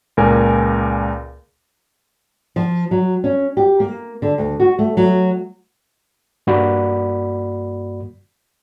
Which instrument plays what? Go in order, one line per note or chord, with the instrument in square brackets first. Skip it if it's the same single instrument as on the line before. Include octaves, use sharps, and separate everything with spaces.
[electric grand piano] C#2 A#2 A#4 G#5
[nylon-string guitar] F3
F#3
C#4
G4
A#3
D3
D2
F#4
A3
F#3
[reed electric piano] G2 A#3 F#4 D5 B5